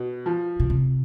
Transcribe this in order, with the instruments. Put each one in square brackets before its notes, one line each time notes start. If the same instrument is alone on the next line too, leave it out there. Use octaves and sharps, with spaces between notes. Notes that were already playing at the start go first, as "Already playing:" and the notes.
Already playing: [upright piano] B2
F3
[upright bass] B2
C3